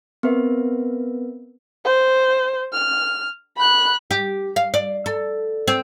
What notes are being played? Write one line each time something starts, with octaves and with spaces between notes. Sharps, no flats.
B3 C4 A#4 B4 E5
C5
F6
B5 F#6
G4
F5
D5
A4
C4